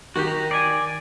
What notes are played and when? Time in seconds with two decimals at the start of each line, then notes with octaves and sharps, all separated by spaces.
0.16 D#3 F#4 G4
0.27 A#5
0.51 D5 G#5